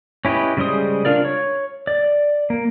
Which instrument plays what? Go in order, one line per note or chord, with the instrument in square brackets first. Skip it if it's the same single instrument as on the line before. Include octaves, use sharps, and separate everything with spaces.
[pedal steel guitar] C#4 E4 G4 B4 D#5
C#3 G3 G#3 C5 D#6
D4 F4 A#4 D5
C#5
D5
A#3